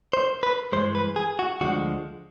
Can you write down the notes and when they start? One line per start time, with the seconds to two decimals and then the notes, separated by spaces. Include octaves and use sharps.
0.13 C5
0.43 B4
0.72 G2 E3 G#3 C5
0.95 B4
1.16 G#4
1.39 F#4
1.61 D2 D3 F3 G#3 F#4